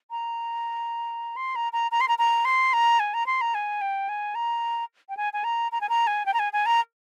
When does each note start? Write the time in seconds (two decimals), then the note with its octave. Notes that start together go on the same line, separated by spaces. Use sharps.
0.11 A#5
1.36 C6
1.55 A#5
1.73 A#5
1.91 A#5
2.01 C6
2.08 A#5
2.18 A#5
2.45 C6
2.73 A#5
2.99 G#5
3.14 A#5
3.26 C6
3.41 A#5
3.54 G#5
3.81 G5
4.09 G#5
4.35 A#5
5.09 G5
5.17 G#5
5.33 G#5
5.44 A#5
5.72 A#5
5.81 G#5
5.89 A#5
6.07 G#5
6.26 G5
6.34 A#5
6.39 G#5
6.53 G#5
6.66 A#5